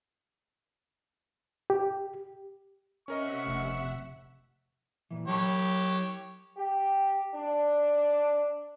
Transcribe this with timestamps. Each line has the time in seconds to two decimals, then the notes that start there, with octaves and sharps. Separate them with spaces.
1.70 G4
3.08 C3 C#4 A#4 D#5 E5 F#5 C#6
3.46 F1
5.11 A#2 E3
5.28 F#3 G4 C#5 A5 B5
6.58 G4
7.35 D4